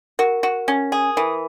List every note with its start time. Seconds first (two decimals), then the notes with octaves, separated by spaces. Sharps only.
0.19 F#4 A#4
0.43 F#4
0.68 C#4
0.92 G#4
1.16 E3 A#4